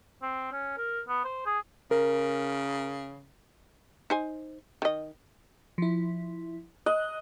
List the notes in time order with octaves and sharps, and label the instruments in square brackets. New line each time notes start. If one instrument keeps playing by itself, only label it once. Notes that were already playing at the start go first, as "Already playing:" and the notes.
[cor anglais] C4
C#4
A#4
B3
C5
G#4
[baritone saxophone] C#3 [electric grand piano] A#4
[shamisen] D#4 C5 G#5
D#3 D#5
[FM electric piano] F3 E4
[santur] D#5 [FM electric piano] F#6